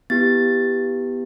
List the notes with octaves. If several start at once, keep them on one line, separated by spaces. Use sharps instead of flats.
B3 E4 G4 A6